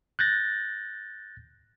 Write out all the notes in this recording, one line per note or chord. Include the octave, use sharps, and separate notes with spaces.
F#6 G6 A6 A#6